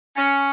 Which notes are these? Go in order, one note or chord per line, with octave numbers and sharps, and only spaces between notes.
C#4